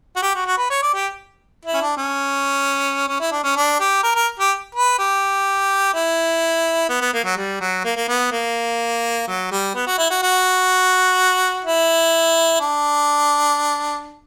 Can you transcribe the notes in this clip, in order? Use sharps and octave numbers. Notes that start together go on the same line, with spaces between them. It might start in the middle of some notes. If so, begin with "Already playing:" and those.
F#4
G4
F#4
F#4
B4
C#5
D5
G4
E4
C#4
D4
C#4
C#4
E4
D4
C#4
D4
G4
A#4
A#4
G4
B4
G4
E4
B3
B3
A#3
F#3
G3
F#3
A#3
A#3
B3
A#3
F#3
G3
B3
F#4
E4
F#4
F#4
E4
D4